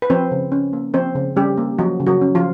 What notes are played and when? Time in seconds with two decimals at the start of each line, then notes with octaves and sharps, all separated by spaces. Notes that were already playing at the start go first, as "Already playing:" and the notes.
0.02 B4
0.10 F3 C4 C5
0.31 C#3
0.52 C#4
0.73 A#3
0.94 F3 C4 C5
1.15 C#3
1.36 G3 C#4 G4
1.57 A#3
1.79 F3 F#3 F#4
2.00 C#3
2.07 F#3 F#4
2.21 C#4
2.35 F3 F4